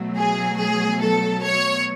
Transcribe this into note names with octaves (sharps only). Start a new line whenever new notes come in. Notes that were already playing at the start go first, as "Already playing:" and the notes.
Already playing: B2 F#3 A3
G#4
G#4
A4
C#5